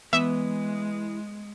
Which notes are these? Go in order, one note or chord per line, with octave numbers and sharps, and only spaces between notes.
E3 G#3 B3 E5